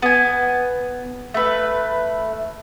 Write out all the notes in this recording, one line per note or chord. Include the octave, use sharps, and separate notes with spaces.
B3 G#5
A3 B4